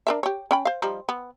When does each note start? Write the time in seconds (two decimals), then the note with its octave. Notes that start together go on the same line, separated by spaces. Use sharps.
0.07 D4 A#4 E5
0.23 G4 C#5
0.51 C#4 G5 B5
0.65 C5 F5
0.82 F3 G3 D#4
1.09 B3